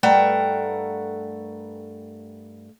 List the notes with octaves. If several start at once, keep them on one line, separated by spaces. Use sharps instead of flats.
G2 A3 A#4 F#5 G5 A#5